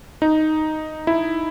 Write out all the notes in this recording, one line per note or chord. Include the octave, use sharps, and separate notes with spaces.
D#4
E4